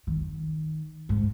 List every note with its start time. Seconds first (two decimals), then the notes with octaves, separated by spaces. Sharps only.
0.07 D#3
1.09 G#2